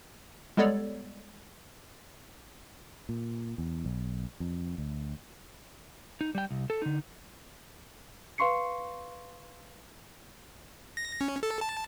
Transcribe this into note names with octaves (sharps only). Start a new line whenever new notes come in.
G3 G#3 B3 A4 C#5 D5
A#2
E2
B1
F2
D2
D#4
G3 G5
C2
A4
D3 D#4
B4 F5 C6 C#6 C7 C#7
A#6
C#4
A4
A5